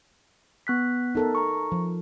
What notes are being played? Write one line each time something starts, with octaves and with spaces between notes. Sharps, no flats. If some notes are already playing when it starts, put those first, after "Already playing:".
B3 F#6 B6
D#4 A4 A#4
A#5 C#6
F3